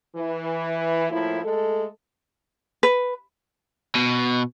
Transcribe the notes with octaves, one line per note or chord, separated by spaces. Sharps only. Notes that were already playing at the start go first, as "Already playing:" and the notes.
E3
A2 F3 A#3 E4
G#3 A3 A4
B4
B2